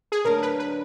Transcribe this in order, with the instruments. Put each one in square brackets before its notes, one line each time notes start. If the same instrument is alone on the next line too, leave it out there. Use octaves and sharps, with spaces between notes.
[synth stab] G#4
[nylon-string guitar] D2 D3 F#3 A#3 D4 [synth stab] A#4
[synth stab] B4
B4